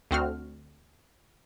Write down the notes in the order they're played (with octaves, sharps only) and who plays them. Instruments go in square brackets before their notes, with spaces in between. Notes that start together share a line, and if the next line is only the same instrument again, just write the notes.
[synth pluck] D2 C4 F#4 F6